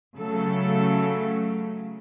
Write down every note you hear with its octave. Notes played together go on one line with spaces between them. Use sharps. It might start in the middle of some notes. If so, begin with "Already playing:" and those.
C#3 F#3 A3 A4